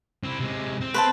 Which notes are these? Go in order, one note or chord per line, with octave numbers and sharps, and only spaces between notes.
C4 E4
C3 G#3
C4
B4 C5 A5